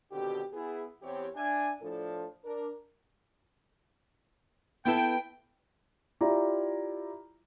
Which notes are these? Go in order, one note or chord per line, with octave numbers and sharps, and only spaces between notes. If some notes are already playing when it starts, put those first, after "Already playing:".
B2 D3 D#3 C4 F#4 G4
B3 E4 G#4
E2 C4 G4 C#5
D4 E5 G#5
A2 F3 D4 A4
D4 A#4
B3 E4 A4 G5
E4 F4 G4 D5 A#5